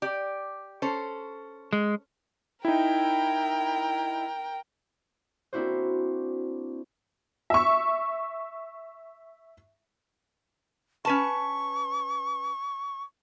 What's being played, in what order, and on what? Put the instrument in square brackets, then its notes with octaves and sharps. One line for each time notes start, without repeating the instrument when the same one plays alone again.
[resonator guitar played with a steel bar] G4 D5
C#4 A4 C5
[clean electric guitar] G#3
[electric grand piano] D#4 E4 [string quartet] A#4 G5
[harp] A#3 C4 D4 E4 F#4 C5
[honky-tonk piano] E5 C#6
[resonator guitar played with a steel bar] C#4 B4 A5 [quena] C#6